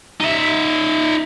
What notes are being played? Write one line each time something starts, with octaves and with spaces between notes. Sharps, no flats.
D#4 E5